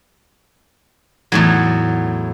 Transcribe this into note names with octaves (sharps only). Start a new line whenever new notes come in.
E2 A2 F#3